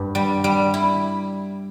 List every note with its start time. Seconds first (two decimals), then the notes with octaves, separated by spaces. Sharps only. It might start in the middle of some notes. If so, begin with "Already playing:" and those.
Already playing: G2
0.15 G3
0.44 G3
0.74 E4